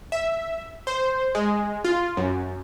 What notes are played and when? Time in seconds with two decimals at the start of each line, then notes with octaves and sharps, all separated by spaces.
0.12 E5
0.87 C5
1.35 G#3
1.85 F4
2.17 F#2